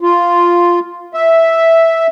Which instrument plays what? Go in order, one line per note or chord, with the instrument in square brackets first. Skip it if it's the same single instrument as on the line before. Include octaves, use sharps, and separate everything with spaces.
[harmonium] F4
E5